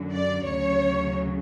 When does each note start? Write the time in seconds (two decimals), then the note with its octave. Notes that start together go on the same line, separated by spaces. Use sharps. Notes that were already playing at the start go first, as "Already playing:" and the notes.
Already playing: F#2 D3 F#3
0.12 D5
0.44 D2 C#3 F#3 C#5